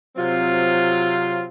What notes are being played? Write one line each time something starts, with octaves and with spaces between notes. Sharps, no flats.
C3 F#3 C4 F4